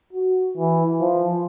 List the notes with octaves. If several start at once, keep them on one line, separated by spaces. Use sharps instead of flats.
F#4
E3
F3